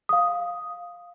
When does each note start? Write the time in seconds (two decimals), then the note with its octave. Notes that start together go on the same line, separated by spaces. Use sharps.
0.09 F5 D#6